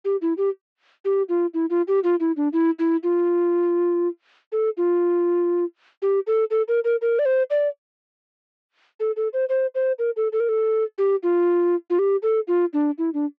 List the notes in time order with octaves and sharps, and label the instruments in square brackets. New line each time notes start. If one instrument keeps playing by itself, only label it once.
[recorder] G4
E4
G4
G4
F4
E4
F4
G4
F4
E4
D4
E4
E4
F4
A4
F4
G4
A4
A4
A#4
A#4
A#4
D5
C5
D5
A4
A4
C5
C5
C5
A#4
A4
A4
A#4
A4
G4
F4
F4
G4
A4
F4
D4
E4
D4